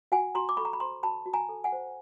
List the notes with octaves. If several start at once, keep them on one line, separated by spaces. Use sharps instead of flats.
F#4 F#5 G#5
F#4 A#5 C6
D6
A4 B5 C#6
A#5
B5
C5 A#5 C6
F#4 A5 B5
F#4
G#5 A#5
A4
F#5 G#5
C5